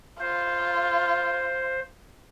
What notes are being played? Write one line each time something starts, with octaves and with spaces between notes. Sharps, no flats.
F4 C5